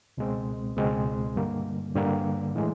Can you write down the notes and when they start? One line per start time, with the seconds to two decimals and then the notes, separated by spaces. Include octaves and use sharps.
0.17 C#2 B2 G#3 C4
0.76 C#2 B2 G#3 C4
1.36 G2 D3 G3 A#3
1.95 G2 D3 G3 A#3
2.55 A2 E3 G#3